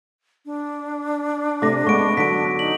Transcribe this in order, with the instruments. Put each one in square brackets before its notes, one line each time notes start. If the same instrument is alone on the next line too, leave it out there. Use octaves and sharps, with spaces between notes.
[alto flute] D4
[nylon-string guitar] C3 A3 [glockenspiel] D6 A#6
[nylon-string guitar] G#3 A3 B3 [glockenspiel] C#6 D7
[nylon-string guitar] D3 F#3 [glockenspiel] B6 D7
[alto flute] D#4 [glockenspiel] F#7